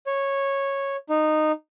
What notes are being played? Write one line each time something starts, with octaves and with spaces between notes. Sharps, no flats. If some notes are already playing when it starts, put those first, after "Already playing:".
C#5
D#4